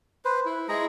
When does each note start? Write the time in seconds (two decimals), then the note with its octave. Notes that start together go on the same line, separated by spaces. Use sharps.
0.25 B4 C5
0.46 E4
0.68 G#3 E4 G#4 A#5